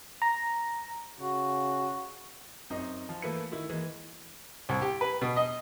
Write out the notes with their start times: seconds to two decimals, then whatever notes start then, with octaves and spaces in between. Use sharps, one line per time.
0.22 A#5
1.20 C#3 F#4
2.70 F#2 C4 D#4
3.09 F3
3.22 E3 A3 A#3 E4 B4 C#7
3.52 D#3 E4
3.70 E3 G#3 A#3
4.69 C2
4.82 G4
5.01 B4
5.21 B2
5.36 D#5